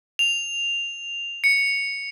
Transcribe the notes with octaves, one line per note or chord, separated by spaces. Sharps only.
F7
C#7